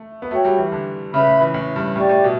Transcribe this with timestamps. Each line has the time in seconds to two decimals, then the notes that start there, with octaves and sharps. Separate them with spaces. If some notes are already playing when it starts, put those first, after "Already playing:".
Already playing: A3
0.22 B3
0.31 A3 F#4 C#5 G5 C#6
0.45 G3
0.58 E3
0.72 D3
1.13 C#3 B4 E5 B5
1.27 A2
1.41 E3
1.54 A2
1.76 G2
1.96 A2 G4 D5 G5 C#6
2.09 A2
2.24 B2